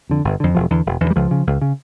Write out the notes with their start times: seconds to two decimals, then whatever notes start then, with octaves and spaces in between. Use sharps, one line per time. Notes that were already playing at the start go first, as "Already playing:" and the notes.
0.10 F2 D3
0.24 G1
0.40 F2 D3
0.55 E1 F3
0.70 E2 D3
0.86 E1
1.01 E2 D3
1.10 G3
1.16 C#2 F3
1.31 C#3
1.47 C#2
1.62 C#3